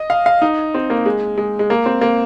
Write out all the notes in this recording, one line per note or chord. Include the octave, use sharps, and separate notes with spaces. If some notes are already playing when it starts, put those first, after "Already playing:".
Already playing: D#5
F5
F5
D#4
C4
A#3
G#3
G#3
G#3
A#3
C4
A#3